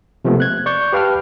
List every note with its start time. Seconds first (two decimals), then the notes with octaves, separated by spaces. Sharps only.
0.25 C3 F3 G#3 A3 B3
0.40 F#6 G#6
0.66 D5 C#6 G6
0.93 G4 B4 F5 G5 A5 F6